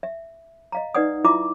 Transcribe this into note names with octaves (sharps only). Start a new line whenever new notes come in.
E5
D#5 F5 A#5
D#4 B4 D5 F#5 D#6
E4 F4 E5 A#5 D6